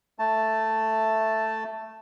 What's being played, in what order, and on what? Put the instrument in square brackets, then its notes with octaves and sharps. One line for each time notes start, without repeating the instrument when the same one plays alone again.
[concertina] A3 A5